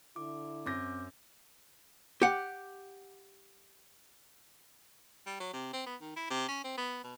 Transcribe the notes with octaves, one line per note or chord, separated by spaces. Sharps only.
D3 E4 D6
F#2 C4 D6 G6 A#6
G4 F#5
G3
F#3
C3
C4
B3
D#3
E4
C3
C#4
C4
B3
B2